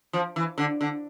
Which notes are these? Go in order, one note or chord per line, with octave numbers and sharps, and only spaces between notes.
F3
E3
D3
D3